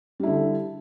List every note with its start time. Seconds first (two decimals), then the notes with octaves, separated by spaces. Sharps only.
0.20 G3
0.23 E4
0.27 D3